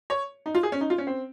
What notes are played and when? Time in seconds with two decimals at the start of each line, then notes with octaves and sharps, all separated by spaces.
0.10 C#5
0.46 D#4
0.55 F4
0.63 G#4
0.72 C#4
0.81 D#4
0.90 F4
0.98 C#4
1.07 C4